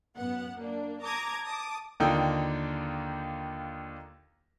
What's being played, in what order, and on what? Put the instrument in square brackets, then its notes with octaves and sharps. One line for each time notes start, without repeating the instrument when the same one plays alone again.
[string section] F#2 B3 F#5
A#3 D4
A5 A#5 D6 D#6 G#6 A#6
A5 D6 D#6
[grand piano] D#2 D3 D#3 D#4 F4 G5